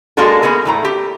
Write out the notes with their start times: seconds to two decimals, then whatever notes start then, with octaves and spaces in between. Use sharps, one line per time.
0.17 G#3 A#3 D4 F4 F#4 A4
0.42 A#3 B3 E4 G#4 A#4
0.65 E2 A2 A#5
0.85 G4